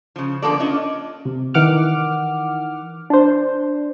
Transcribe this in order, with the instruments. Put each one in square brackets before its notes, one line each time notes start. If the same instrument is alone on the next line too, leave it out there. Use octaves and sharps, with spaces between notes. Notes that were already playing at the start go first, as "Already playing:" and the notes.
[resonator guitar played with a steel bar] C#3 F3
D3 F3 A#3 B3 A4 D5
C#4 D4 F4 D#5
[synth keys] C3
D#3 E3 F#5 D6 F6
D4 C5